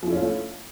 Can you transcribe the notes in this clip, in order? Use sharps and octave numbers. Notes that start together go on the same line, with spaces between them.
F3 A3 C#4 E4 F4